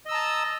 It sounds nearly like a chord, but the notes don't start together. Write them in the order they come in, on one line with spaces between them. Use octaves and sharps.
D#5 E6 A#5 A5